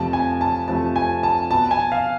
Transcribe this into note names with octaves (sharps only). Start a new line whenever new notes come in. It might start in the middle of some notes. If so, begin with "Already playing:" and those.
Already playing: F2 C3 F3 A3 A5
G#5
A5
F2 C3 F3 A3 A5
G#5
A5
B2 B3 A5
G#5
F5